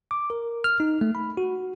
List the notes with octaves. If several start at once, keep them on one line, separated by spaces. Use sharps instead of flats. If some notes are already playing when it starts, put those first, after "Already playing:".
D6
A#4
F6
D#4
A3
B5
F#4